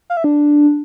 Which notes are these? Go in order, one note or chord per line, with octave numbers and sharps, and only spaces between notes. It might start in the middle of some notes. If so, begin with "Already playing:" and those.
F5
E5
D4